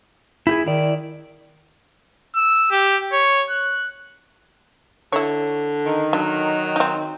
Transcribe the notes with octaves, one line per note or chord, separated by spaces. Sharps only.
E4 G4 G#4
D#3 E4 D5
E6
G4
C#5
F#6
D3 E4 C#5
D#3
D3 F#3
C4 D#4